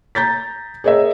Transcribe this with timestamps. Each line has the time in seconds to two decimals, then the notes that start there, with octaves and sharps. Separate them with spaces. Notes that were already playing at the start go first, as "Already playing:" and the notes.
0.15 A#5 G6 A6 B6
0.84 G#4 A#4 C#5 D#5 E5 A#5